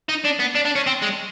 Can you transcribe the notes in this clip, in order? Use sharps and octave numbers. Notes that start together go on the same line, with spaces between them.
D#4
D4
B3
D4
D4
C#4
C4
G#3